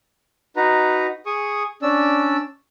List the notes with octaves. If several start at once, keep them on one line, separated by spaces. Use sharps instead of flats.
D#4 F#4 B4 A#5
G#4 C#6 D#6
C#4 D4 D5 E6